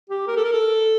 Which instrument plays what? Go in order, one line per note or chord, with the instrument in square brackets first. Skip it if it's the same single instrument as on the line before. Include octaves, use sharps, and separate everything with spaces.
[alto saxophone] G4
A#4
A4
A#4
A4